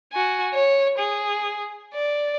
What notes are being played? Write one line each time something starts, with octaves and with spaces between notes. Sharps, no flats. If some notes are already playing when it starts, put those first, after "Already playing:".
F#4 G#5
C#5
G#4
D5